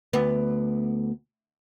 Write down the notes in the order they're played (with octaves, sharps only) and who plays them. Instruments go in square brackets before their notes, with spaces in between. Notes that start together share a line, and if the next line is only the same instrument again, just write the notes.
[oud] D2 B3